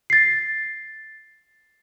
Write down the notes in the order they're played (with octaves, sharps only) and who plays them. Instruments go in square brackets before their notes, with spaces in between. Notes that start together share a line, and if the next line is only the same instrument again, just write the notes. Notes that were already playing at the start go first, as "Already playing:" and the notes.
[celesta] A6 C7